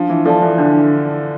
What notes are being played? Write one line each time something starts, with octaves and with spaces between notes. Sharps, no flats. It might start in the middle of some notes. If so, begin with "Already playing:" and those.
Already playing: F3 D4
E3
F3 A4 D5 A5
E3
D3 D4